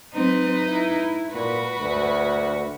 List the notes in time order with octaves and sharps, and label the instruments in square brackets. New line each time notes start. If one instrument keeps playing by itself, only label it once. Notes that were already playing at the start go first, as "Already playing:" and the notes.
[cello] F#3 C4 [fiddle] D#4 B4
[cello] E4
[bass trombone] A#2 [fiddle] F#4 [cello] B4
[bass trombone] D2